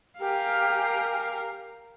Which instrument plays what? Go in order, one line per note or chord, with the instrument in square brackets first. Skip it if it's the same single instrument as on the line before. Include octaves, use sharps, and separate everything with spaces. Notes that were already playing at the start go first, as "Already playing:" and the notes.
[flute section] G4 G5 G#5 [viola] A#4 F5